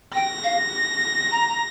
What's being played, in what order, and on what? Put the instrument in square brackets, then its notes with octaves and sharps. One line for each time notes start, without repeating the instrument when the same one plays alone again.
[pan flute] G5 [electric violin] A#6
[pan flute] F5
A#5
A#5